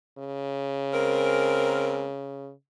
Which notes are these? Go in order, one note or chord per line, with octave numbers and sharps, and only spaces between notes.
C#3
G#3 C4 A#4